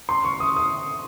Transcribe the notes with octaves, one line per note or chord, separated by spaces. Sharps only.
C6
C#6
D#6
D#6